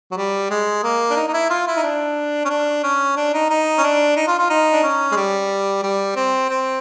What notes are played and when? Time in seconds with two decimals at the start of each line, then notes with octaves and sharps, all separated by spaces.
0.12 F#3
0.17 G3
0.50 G#3
0.84 A#3
1.11 D4
1.17 D#4
1.28 D#4
1.33 E4
1.50 F4
1.67 E4
1.77 D#4
1.83 D4
2.45 C#4
2.50 D4
2.83 C#4
3.16 D4
3.34 D#4
3.50 D#4
3.78 C#4
3.84 D4
4.17 D#4
4.27 F4
4.39 F4
4.50 D#4
4.73 D4
4.83 C#4
5.12 G#3
5.16 G3
5.83 G3
6.16 C4
6.49 C4